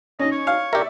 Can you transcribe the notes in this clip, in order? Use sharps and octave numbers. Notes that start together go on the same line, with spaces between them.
C#4 D#4 D#5
C#5
F5
G4 A#4 D5 E5